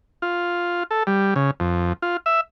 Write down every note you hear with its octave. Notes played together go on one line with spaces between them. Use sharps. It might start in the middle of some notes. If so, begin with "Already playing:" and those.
F4
A4
G3
C#3
F2
F4
E5